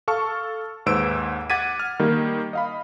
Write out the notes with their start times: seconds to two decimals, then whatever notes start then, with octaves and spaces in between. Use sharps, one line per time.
0.08 A4 F5 A5 C#6 F6
0.86 D#2 G#2 B4 C5 E6 D7
1.50 F#5 D6 G#6 A6 B6 D#7
1.79 F6
1.99 D#3 G3 A#3
2.53 D#5 F5 B5